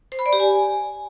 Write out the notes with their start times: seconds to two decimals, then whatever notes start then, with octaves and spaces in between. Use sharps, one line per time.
0.12 C5
0.19 B5
0.26 D5
0.33 G4
0.40 G#5